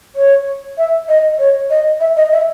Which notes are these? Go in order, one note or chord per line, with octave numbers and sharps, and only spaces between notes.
C#5
E5
D#5
C#5
D#5
E5
D#5
E5